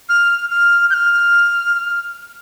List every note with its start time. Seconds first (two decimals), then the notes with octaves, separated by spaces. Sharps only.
0.09 F6
0.50 F6
0.90 G6
0.94 F6